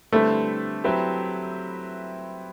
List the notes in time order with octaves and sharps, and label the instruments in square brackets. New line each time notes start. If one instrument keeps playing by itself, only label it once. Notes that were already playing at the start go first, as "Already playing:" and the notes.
[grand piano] D3 G3 C4 E4 B4 [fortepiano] A3
[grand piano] F#3 C4 E4 G4 B4